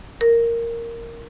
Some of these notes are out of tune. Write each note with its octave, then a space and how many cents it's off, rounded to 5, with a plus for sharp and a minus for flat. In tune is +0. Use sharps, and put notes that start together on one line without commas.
A#4 -5